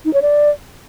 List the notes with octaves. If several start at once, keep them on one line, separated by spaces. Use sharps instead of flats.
D#4
C#5
D5